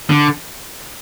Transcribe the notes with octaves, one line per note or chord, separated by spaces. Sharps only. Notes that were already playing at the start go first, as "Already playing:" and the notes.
D3